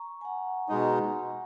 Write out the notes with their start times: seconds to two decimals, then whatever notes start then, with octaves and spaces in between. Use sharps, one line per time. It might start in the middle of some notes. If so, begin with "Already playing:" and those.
Already playing: A#5 C#6
0.21 G#5
0.25 F#5 A#5
0.69 B2 G#3 D#4